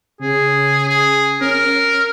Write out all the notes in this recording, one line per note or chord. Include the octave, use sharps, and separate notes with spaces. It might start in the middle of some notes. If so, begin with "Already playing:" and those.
C#3 G#4
G#4
C#4 A#4